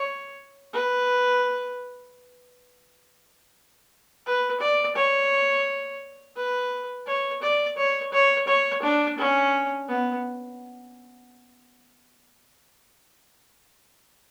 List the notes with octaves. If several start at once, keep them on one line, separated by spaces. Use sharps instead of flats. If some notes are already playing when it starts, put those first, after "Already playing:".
Already playing: C#5
B4
B4
D5
C#5
B4
C#5
D5
C#5
C#5
C#5
D4
C#4
B3